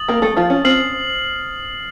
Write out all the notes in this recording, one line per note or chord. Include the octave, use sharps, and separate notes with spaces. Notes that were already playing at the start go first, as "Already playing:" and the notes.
Already playing: D#6 A6 F#7
A#3 A#4
A3 A4
F3 F4
C#4
C4 F6 C7 F#7